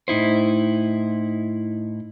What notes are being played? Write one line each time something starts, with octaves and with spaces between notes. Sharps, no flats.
A2 D#4 E4 C5